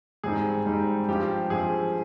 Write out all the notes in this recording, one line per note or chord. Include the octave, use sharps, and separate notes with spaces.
G#2 G3 C4 D#4 G#4
G#2 G3 C4 D#4
G2 F3 C4 G4
G2 F3 C4 G#4